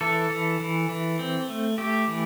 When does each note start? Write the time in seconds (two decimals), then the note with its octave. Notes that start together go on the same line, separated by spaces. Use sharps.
0.01 E3 A4
0.30 E3
0.60 E3
0.89 E3
1.19 C4
1.49 A3
1.78 A3 G4
2.08 E3